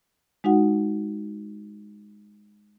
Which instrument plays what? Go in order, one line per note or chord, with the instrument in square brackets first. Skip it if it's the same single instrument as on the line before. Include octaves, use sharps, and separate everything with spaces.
[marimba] G#3 D#4 F#4 F#5